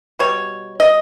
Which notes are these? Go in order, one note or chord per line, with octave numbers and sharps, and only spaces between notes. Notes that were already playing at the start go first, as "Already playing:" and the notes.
B2 G3 C#5
D#5